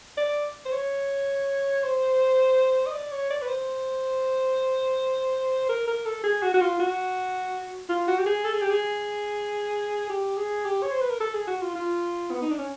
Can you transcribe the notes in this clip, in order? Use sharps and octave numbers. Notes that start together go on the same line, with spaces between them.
D5
C5
C#5
C5
D#5
D5
C#5
D5
B4
C5
A#4
A#4
A4
G#4
F#4
F#4
F4
F#4
F4
F#4
G4
G#4
A4
G#4
G4
G#4
G4
G#4
G4
C#5
C5
B4
A#4
A4
G#4
F#4
F4
F4
B3
D#4
D4
C#4